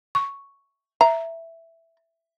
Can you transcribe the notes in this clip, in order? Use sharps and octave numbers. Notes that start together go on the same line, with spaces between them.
C#6
E5 A#5